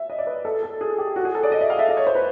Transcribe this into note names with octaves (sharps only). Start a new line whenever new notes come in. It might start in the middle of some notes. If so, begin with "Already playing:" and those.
Already playing: E5
D#5
D5
B4
A4
A4
G#4
G4
F#4
G#4
A4
D5
D#5
E5
F5
E5
D#5
C#5
C5
B4